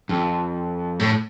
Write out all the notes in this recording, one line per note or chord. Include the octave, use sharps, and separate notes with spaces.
F2
A2